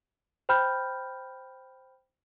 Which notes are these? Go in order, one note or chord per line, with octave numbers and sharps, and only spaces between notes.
C5 G5 B5 F6 G6